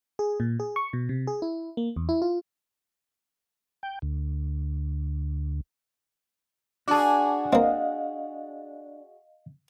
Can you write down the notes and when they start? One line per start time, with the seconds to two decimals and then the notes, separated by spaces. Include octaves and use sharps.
0.19 G#4
0.40 A#2
0.60 G#4
0.76 C#6
0.93 B2
1.09 C3
1.27 G#4
1.42 E4
1.77 A#3
1.96 E2
2.09 E4
2.22 F4
3.83 G5
4.02 D2
6.88 D4 F#4 G#4 A5 D6
7.53 A#3 C4 D#5 F5